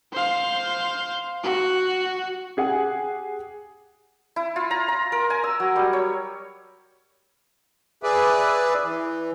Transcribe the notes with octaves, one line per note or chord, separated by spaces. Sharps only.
C5 F5
F#4
G4 G#4 F#5 G#5
E4
F4
A#5
A#5
A#4
G#5
E6
F#3
G3
C#5
G#4 B4 D5 E5
E3